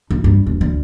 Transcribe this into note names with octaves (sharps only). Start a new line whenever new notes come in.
D#4
G2
E1
D2